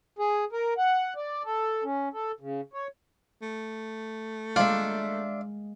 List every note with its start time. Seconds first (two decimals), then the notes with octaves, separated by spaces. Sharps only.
0.19 G#4
0.53 A#4
0.78 F#5
1.16 D5
1.45 A4
1.84 C#4
2.14 A4
2.40 C#3
2.74 C#5
3.42 A3
4.56 G#3 A#3 D4 F4 E5